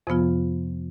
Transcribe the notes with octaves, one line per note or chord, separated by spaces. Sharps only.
F2 C3 F3 B3 F4